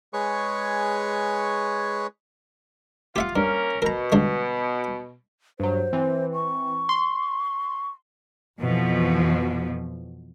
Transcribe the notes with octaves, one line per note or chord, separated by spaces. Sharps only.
G#3 G#4 B4 C#5 C#6
F4 G4 E5 F#5
G2 A#3 C#4 A#4
B2 A#4 A#5
G2 D3 G#3
G2 F#3 C5
E3 C4
C#6
C6
F2 B2 E3 F3